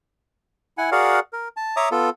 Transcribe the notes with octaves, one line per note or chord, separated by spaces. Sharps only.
E4 F#5 G#5
F#4 G#4 A#4 D5 F5 F#5
A#4
A5
C#5 E5 A#5 D6 D#6
B3 F4 A4